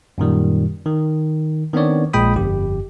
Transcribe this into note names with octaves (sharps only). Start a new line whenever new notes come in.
F#2 A#2 D#3 G3
D#3
D#3 B3 C4 D4 C#5 D5
A#1 A#2 G#3 G5 B5 D#6
G1 F2 G4